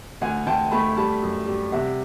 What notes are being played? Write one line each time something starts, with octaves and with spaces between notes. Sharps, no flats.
D2 F#5 G#5
D2 G5 A5
A3 A5 B5
G3 A5 B5
F#2
G3
C3 E5 F#5